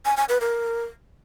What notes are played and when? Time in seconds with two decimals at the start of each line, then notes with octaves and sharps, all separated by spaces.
0.05 G#5
0.17 G#5
0.29 B4
0.41 A#4